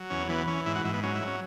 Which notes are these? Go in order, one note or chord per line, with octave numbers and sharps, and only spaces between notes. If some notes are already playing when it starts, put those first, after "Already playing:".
Already playing: F#3
E2 C#4
E3 B3
E3 C#4
G#2 E4
F#4
G#2 E4
B3
F#3 C#4
E4
F#3
C#4